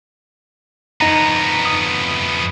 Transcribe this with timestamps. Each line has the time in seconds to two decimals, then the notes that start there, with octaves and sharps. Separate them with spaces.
1.01 F2 B3 D#4 A#5
1.65 D#6